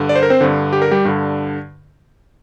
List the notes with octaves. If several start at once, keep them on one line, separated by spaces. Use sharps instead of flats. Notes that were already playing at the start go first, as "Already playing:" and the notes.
Already playing: G2 D3
D5
C5
A#4
C4 C5
G2 D3
G4
A#4
G3 G4
G2 D3